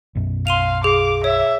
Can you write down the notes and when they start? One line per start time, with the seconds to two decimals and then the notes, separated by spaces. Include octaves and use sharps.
0.15 B1 F#2 B2
0.47 F5 C6 D#7 F7
0.84 G#4 F5 D6
1.24 C#5 E5